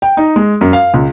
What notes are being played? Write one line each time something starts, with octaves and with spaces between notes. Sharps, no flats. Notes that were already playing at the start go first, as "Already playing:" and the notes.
G5
D#4
G#3
F#2
F5
C#2